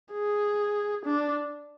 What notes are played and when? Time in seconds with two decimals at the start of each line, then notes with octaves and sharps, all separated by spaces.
0.14 G#4
1.05 D4